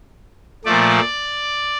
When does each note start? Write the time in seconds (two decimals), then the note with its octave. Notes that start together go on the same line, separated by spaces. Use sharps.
0.65 A#2 F3 A3 D5